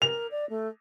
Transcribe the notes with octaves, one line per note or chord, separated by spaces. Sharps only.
A#4 F7
D5
A3